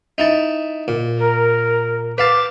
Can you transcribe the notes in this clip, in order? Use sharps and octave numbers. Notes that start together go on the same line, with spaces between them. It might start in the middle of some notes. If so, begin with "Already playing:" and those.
D#4 E4 A5
A#2
A#4
B4 F5 A5 D6